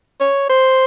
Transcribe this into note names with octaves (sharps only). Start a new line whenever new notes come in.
C#5
C5